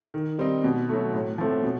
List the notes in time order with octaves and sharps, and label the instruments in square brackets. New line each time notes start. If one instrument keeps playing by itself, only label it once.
[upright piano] D#3
G3 C4 D#4
B2
F#3 A3
A2
F3 A3 C4
B2